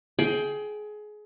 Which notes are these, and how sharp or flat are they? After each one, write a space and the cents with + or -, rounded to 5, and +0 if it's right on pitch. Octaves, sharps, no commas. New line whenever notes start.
G#4 +25 G5 +0